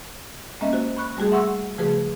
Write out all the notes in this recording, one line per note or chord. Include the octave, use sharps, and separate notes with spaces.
G#3 A#3 C#4 D#5 E5
F#4 C5
B5 C#6 F#6
G3 A3 F#4 G#4
E5 F#5 C6 C#6 E6
C#3 F3 A3 F#4 G#4 B4